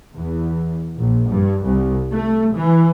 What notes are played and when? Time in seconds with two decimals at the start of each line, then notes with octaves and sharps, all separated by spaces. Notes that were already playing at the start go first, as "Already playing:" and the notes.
0.15 E2
0.98 A#1
1.28 G2
1.63 C2
2.12 A3
2.55 E3